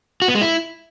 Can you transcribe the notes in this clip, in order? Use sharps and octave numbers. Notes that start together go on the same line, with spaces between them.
F#4
B3
G#3
E4